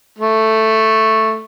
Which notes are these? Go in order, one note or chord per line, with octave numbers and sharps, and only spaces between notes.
A3